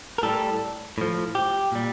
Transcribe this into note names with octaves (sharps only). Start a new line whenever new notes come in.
A#4
A2 G3 A4
A2 F3
G4
A#2 G3